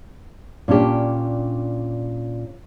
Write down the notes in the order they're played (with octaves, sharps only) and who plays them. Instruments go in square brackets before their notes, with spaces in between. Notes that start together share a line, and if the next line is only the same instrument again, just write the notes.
[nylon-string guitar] A#2 C#4 D4 G4